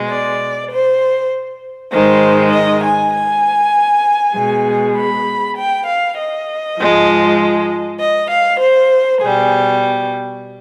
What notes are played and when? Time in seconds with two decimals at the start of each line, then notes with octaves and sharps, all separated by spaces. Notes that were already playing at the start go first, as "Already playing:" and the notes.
Already playing: B2 G#3
0.09 D5
0.70 C5
1.92 G#2 D#3 G#3 C5
2.52 D#5
2.83 G#5
3.13 G#5
4.35 B2 G#3
4.96 B5
5.56 G5
5.86 F5
6.17 D#5
6.77 G#2 F3 G#3
7.99 D#5
8.30 F5
8.60 C5
9.21 B2 G3 G#4